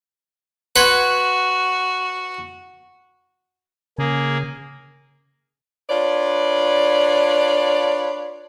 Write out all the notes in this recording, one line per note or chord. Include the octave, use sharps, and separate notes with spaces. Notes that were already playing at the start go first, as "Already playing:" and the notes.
F#4 B4 F#5 C6 G#6
C#3 A#3 G#4
D4 F4 B4 C#5 D5